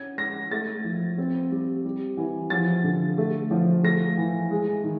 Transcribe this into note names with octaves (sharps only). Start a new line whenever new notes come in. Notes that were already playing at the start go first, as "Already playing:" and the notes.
Already playing: C#4 G#6
G#3 A#6
A3 A6
F3
C4
G3
G3
E3
F3 A6
D3
A3
F3
A3 A#6
E3
G#3
D#3